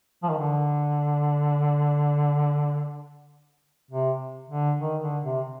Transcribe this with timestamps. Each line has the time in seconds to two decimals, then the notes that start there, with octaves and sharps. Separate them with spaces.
0.23 F3
0.30 D#3
0.38 D3
3.91 C3
4.50 D3
4.80 D#3
5.02 D3
5.24 C3